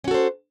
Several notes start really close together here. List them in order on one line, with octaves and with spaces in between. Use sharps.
C#4 F#4 A4 C5